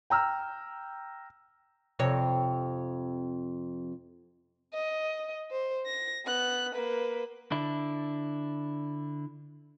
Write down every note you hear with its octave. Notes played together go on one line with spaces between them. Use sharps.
G5 A#5 E6 F6
F2 C3 C#5
D#5
C5
A#6
B3 F#6
A#3 B4
D3 D4 E4